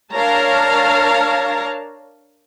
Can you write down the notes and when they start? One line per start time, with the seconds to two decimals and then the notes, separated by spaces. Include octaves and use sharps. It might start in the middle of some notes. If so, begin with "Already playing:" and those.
0.13 D4 A#4 C#5 F5 A5 A#5